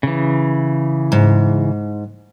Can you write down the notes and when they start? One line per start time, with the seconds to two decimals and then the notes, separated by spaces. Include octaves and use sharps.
0.03 C#3 E3
1.12 G#2